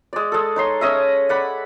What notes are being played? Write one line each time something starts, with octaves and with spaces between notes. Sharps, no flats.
G#3 D5
G#3 A4
D#4 C#5 C6
C#4 D#5 E5
D5 F#5 B5